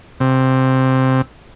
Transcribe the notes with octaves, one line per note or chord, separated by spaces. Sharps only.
C3